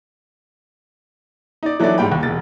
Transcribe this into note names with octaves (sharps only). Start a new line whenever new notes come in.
D#4 D5
E3 F#3 D4 E4 A4 D5
G#2 G3 G5 B5
D#2
E1 A6